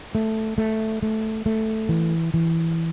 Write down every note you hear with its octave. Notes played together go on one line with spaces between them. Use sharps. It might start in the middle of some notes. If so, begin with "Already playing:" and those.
A3
A3
A3
A3
E3
E3